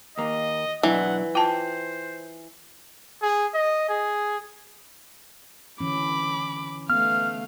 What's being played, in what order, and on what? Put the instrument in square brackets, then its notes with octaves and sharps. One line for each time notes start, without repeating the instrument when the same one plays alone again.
[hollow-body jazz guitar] D#2 A#3 [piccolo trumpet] D#5
[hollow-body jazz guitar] B2 F#3 D4 [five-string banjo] E3 [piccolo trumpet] F#5
[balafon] F4 A5 [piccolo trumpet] C5 [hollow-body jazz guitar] G5
[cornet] G#4
D#5
G#4
[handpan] D3 E3 C#4 [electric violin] B5 D6
[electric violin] A3 F5 [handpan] B3 [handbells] F6